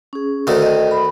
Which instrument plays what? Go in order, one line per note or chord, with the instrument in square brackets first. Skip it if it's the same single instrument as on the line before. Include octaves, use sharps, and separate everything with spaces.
[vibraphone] C#4 G#4
[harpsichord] D2 D#3
[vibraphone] D#5 G5
B5